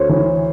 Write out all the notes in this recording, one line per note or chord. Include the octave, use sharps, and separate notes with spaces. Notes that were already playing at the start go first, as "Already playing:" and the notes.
Already playing: D2 C5 C#5
E3